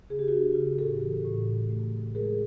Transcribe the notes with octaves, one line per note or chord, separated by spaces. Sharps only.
C#3 G#4
G4
F#4 G#4
D4
C#3
A2 G4 A4
E3
A2
A3
A3
F#3
G#3 G#4 A#4